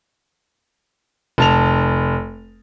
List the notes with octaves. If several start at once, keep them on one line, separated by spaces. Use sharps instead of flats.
F1 A5 F7